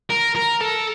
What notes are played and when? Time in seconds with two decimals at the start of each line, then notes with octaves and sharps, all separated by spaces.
0.10 A#4
0.35 A#4
0.61 A4